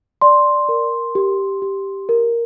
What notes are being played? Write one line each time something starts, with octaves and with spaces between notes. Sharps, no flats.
D5 C6
A#4
G4
G4
A#4